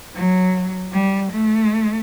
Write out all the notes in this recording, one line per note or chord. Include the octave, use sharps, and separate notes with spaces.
F#3
G3
A3